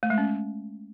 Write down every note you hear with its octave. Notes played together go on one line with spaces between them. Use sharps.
A3
G#3
C#4